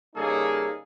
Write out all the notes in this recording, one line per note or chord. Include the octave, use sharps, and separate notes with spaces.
C#3 G3 A#3 D#4 G#4 A4